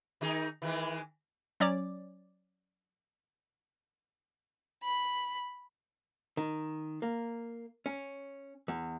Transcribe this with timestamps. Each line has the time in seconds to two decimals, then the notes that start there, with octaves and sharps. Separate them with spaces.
0.21 D#3 D#4 G#4
0.62 D#3 E3 G#3
1.60 F#3 C#4 C#5 D5 D6
4.83 B5
6.37 D#3
7.02 A#3
7.86 C#4
8.68 E2